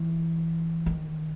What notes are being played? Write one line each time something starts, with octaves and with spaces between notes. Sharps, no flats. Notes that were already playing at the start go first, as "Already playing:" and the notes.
Already playing: E3
D#3